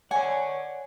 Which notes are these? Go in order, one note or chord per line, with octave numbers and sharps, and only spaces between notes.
C#5 D5 F#5 G#5